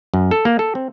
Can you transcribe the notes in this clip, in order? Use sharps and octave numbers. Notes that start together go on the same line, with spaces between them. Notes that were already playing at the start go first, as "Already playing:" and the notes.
F#2
A4
A#3
A4
C4